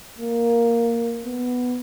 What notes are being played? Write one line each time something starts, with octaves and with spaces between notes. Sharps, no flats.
A#3
B3